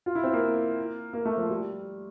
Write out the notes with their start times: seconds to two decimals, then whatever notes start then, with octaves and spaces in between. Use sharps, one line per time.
0.06 F4
0.15 E4
0.24 C4
0.33 A#3
1.13 A#3
1.25 A3
1.37 F3
1.50 G3